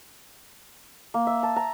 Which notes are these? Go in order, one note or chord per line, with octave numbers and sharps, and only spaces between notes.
A#3
E5
A5
A#5